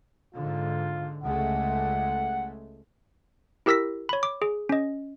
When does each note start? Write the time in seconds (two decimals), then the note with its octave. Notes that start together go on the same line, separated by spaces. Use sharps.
0.34 G#2 D3 F4
1.23 C#2 G#3 A3 F#5
3.66 E4 G4 A#4 E6 A#6 B6
4.09 C#5 B5
4.23 D6
4.42 G#4
4.69 C#4 D#5